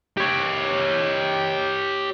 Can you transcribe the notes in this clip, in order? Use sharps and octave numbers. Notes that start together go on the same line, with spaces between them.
G4 C#5